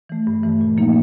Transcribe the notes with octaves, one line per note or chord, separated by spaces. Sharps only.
E3 A3
G2
E3 A3
A#2
F3 A#3 D#4